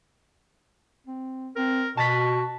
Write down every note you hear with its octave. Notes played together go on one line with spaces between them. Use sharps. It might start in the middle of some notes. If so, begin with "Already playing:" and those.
C4
C4 A#4
B2 F#4 A5 A6 B6